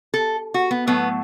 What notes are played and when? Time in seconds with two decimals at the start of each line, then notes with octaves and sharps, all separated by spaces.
0.14 A4
0.54 F#4
0.71 B3
0.87 A2 F#3 A3 B3